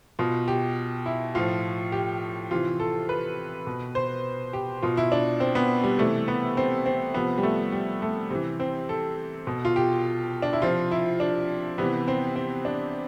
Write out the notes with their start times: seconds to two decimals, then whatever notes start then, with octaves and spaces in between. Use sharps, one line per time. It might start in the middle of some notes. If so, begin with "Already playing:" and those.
0.19 B2 F4
0.48 G4
1.06 E4
1.35 A2 F3 F4
1.92 G4
2.51 C3 E3 F4
2.80 A4
3.09 B4
3.67 B2
3.95 C5
4.53 G4
4.82 B2 F4
4.97 E4
5.12 D4
5.40 C4
5.55 B3
5.84 G3
5.98 C3 E3 A3
6.28 B3
6.57 C4
6.86 C4
7.14 C3 F3 B3
7.38 G3
7.43 A3
7.72 G3
8.02 A3
8.30 C3 E3
8.60 C4
8.89 A4
9.47 B2
9.65 F4
9.76 G4
10.42 D4
10.53 E4
10.62 C3 F3 F4
10.91 E4
11.20 D4
11.78 C3 E3 B3
12.08 C4
12.36 C4
12.65 D4